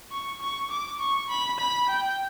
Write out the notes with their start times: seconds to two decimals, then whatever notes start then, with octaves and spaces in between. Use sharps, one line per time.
0.12 C#6
0.41 C#6
0.71 D6
1.00 C#6
1.30 B5
1.59 B5
1.89 G5